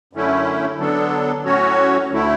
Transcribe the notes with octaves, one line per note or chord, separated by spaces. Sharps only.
F#2 D3 A3 C#4 E4
D3 F#3 B3 D4 A4
A2 F#3 C#4 F#4 C#5
D2 D3 A3 E4